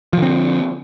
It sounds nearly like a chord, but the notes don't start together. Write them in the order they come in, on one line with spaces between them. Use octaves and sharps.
F3 D3 C4